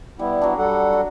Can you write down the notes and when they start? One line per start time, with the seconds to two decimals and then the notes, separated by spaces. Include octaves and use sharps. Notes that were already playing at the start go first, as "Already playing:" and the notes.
0.19 G3 B3 E4
0.42 F#3 D4
0.58 G3 A4 F#5
0.93 F#4